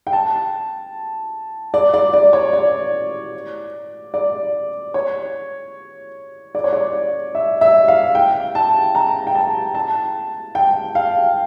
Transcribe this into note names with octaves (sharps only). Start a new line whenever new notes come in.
G5
A5
D5
D5
D5
C#5
D5
D5
C#5
D5
C#5
D5
E5
E5
F5
G5
A5
A#5
G5
A5
A5
G5
F5